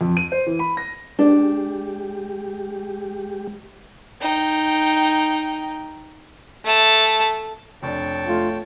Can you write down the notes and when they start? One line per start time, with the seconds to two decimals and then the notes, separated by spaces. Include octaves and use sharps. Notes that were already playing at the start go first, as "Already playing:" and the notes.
0.01 F2
0.17 D#7
0.32 C5
0.47 E3
0.59 B5
0.77 A#6
1.19 G#3 D4 G4
4.21 D#4 G5
6.65 A3 A5
7.83 F1 D4 C#5 G5 A5
8.28 A3 F4